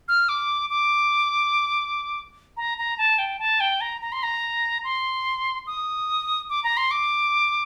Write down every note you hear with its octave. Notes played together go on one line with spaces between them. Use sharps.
F6
D6
D6
A#5
A#5
A5
G5
A5
G5
A#5
A#5
C6
A#5
C6
D#6
D6
A#5
C6
D6